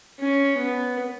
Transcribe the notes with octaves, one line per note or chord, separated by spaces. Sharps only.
C#4
B3